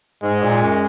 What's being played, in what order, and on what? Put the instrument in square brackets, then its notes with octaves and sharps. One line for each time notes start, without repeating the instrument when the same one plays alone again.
[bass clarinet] G#2 [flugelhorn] G#3
[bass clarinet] A#2
F#2